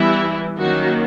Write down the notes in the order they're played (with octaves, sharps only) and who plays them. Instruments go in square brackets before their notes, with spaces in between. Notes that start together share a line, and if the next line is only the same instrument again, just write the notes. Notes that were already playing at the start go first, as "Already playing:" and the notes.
Already playing: [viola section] E3 G3 B3 E4
D#3 F#3 A#3 C#4 F#4